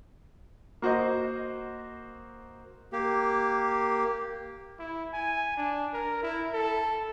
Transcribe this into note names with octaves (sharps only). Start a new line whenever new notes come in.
A#3 F#4 C5 D#5
A#3 G4
E4
G#5
D4
A#4
E4
A4